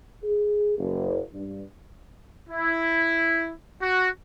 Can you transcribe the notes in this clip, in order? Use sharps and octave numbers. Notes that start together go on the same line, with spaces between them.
G#4
F#1
G2
E4
F#4